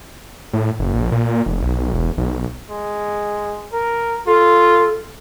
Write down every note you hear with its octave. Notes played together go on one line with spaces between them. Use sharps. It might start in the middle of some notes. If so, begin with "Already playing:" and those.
A2
F#1
A#1
A#2
F1
B1
E1
B1
G#3
A#4
F4 A4